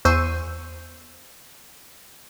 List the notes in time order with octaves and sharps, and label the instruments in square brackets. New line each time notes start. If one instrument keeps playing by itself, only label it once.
[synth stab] E2 C5 C#6 E6 D#7